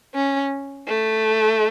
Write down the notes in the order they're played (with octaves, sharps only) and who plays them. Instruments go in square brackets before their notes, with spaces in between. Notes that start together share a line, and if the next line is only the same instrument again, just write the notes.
[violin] C#4
A3